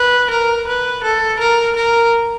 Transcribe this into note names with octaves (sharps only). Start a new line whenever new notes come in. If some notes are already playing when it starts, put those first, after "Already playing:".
Already playing: B4
A#4
B4
A4
A#4
A#4